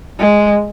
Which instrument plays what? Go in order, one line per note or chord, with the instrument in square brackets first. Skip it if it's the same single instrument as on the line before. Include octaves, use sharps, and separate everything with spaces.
[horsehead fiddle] G#3